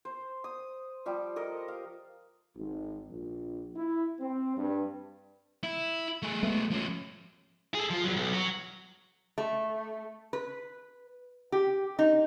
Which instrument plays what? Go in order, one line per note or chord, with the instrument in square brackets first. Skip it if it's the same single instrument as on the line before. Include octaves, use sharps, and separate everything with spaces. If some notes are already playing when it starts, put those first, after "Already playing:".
[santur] C5
D#6
F3 G3 G4
A4 A#4 D#5
F5
[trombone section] G#1
A#1
E4
C4
G2
[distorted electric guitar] E4
A3 G#4
[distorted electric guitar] G#3 B3 [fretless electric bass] A3
[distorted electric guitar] F3 C#4
G#4 A4
F3 F4
E2 F#3
B1
F#3 F#4
[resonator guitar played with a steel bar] A3
B4
G4
D#4